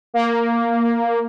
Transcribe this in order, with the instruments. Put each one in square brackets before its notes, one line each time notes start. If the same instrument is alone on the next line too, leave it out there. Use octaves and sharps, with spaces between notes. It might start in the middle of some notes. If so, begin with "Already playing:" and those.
[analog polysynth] A#3